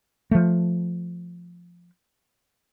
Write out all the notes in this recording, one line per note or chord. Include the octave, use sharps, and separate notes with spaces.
F3 A3